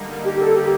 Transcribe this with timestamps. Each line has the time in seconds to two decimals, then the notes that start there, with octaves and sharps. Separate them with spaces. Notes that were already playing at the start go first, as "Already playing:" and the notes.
Already playing: D3 G3 A#3 D#4
0.25 G4
0.40 A4
0.55 G4